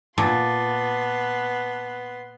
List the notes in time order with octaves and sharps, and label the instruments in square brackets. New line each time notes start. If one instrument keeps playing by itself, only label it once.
[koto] A#2 [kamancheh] B3 C6 [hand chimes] A5 D6 A6